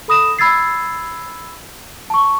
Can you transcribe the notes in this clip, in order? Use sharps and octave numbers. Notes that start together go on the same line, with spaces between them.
A4 B5 D#6 A#6 E7
B5 E6 G#6 A6 C7
A5 C#6